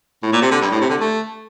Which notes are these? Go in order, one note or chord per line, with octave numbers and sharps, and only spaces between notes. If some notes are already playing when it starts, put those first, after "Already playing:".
A2
A#2
C3
D3
G2
A2
C3
D3
A3